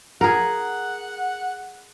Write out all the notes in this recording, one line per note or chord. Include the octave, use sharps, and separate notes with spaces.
G#4 A#4 F#5